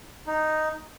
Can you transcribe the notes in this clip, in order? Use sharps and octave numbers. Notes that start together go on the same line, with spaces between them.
D#4